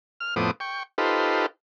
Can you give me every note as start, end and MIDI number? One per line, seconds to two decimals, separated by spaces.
0.20 0.35 89
0.36 0.51 41
0.36 0.51 45
0.36 0.51 59
0.36 0.51 72
0.36 0.51 86
0.36 0.51 87
0.60 0.83 79
0.60 0.83 85
0.98 1.46 63
0.98 1.46 65
0.98 1.46 67
0.98 1.46 69
0.98 1.46 71
0.98 1.46 72